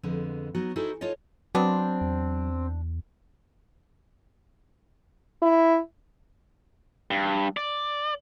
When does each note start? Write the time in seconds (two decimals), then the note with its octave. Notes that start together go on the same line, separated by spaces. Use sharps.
0.03 F2 D3 G#3 B3
0.55 F#3 B3 D#4 F#4
0.76 D#4 E4 F#4 G#4 A4 C5
1.01 D#4 F4 A4 C#5 D#5
1.55 F#3 B3 C4 D4
2.01 E2
5.42 E4
7.11 G2
7.57 D5